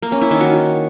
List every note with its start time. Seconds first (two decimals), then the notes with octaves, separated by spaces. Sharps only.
0.02 A#3
0.12 C#4
0.21 E4
0.31 D#3
0.40 F#4